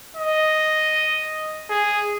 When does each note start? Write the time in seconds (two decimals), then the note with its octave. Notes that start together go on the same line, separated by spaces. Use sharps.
0.17 D#5
1.70 G#4